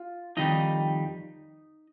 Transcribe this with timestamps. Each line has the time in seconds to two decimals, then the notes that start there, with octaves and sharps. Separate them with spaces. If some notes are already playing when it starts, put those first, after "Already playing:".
Already playing: F4
0.37 F2 D#3 G3 D#4 D#5